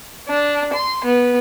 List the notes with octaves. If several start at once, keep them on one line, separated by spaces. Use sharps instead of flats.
D4
C6
B3